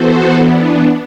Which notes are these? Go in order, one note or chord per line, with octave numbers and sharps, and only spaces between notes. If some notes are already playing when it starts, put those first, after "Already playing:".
Already playing: E3 B3 F#4 A4 C5
E3 B3 D4